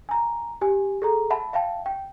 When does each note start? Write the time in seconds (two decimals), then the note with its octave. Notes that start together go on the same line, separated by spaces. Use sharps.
0.09 G#5 A#5
0.61 G4 G#5
1.02 G#4 A4 A#5
1.30 E5 F#5 A5 B5
1.53 E5 F5 G5 A5
1.86 G5